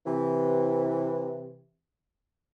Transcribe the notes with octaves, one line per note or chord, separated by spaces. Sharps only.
C3 E3